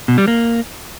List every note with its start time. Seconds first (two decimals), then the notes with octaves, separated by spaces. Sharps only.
0.08 B2
0.18 G3
0.28 A#3